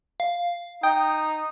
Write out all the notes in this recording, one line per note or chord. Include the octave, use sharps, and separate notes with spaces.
F5
D#4 G5 D#6